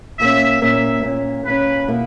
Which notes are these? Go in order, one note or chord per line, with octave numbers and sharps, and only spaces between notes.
A#2 A#3 C#4 E5
A#2 A#3 C#4 E5
A#2 A#3 C#4
A#2 A#3 C#4 B4
B2 A#3 E4